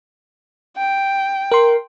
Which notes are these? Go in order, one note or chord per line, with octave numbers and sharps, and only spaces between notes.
G5
A#4 C6